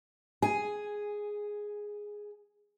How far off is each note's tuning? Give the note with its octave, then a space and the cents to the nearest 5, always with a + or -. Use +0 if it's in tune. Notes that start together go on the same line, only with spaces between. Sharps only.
G#4 +0 G#5 +0